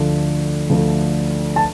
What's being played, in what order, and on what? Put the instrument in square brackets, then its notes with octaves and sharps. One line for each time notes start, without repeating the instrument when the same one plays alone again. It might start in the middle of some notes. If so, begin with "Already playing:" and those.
Already playing: [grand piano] D2 D3 F3 A3
D2 D3 F3 A3
A5